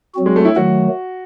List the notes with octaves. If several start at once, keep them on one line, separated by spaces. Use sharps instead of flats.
F#3 C4 F#4
G#3
A3
E4
D#3 F#3 A3 F#4